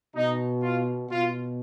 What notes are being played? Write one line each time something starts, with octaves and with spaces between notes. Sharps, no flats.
B2 D#4
F4
B2 F4